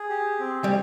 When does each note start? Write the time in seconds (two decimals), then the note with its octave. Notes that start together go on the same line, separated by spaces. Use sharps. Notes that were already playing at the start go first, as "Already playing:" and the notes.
Already playing: G#4
0.10 G4
0.39 C4
0.64 G3